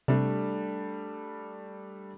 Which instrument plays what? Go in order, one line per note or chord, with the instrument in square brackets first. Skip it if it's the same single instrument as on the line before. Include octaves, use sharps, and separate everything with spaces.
[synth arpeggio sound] C3 [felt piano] G3 A3 D4